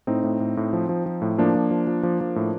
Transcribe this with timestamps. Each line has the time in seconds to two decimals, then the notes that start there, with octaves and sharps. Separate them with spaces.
0.07 A2 C4 D#4
0.24 A2
0.40 A2
0.57 A2
0.73 F3
0.89 F3
1.06 F3
1.22 A2
1.38 F3 A#3 D4
1.55 F3
1.71 F3
1.87 F3
2.03 F3
2.21 F3
2.36 A2